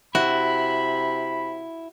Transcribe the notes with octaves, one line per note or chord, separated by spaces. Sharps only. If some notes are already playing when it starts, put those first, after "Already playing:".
C3 E4 F#4 B5